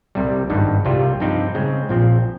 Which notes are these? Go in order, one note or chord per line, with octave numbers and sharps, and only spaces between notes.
C2 C3 G3
G#1 G2 D#3 G3
C2 C3 G3 C4 F4
G2 F3 C4 D#4 G4
C#3 G#3 C4
A#1 A#2 F3 C4